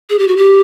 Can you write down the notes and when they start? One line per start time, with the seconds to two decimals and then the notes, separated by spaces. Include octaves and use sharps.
0.10 G#4
0.19 G4
0.28 F#4
0.37 G4